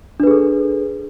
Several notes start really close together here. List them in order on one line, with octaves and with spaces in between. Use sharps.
D4 B4 G#4 A4